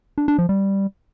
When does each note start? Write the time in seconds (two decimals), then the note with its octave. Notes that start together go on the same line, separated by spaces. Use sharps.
0.18 D4
0.28 D4
0.39 F3
0.49 G3